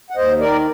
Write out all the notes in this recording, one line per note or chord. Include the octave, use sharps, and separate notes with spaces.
F#5
D#2 C5 D#5
D#3 A#4 D5